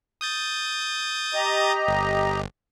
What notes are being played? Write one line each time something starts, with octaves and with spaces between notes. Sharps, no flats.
D#6 G6 A6
G4 D#5 A#5
G1